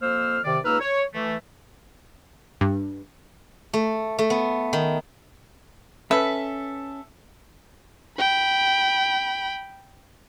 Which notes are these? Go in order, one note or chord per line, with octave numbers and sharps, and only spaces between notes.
F2 A#3 C5 E6 F6
C3 D#3 D5
C#2 A#3 D#4 B4 E6 F6
C#5
E3 A3
G2
A3
A3
B3
D#3
C#4 A4 B4 E5
G5 B5